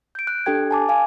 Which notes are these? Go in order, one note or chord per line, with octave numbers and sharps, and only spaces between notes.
G6 D7
F#6
D4 G4 A4 G5 G#6
G#5 A5 D6
F5 G#5